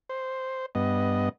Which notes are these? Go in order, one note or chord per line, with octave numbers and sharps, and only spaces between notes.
C5
G2 B3 D#5